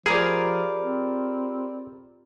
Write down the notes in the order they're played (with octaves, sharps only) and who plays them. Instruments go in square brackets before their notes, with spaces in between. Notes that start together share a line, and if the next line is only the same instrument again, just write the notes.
[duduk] F3 [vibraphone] F4 G4 B5 [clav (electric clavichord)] G#4 [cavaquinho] A#4 D5
[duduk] C4